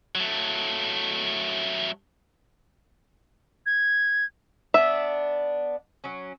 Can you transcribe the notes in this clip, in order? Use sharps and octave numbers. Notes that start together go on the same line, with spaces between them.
F#3 A3
G#6
B3 D4 E5
F#3 C#4